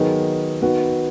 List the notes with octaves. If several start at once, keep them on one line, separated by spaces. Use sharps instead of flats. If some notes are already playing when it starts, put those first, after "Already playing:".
Already playing: D#3 F#3 B3 G#4
D#3 B3 F#4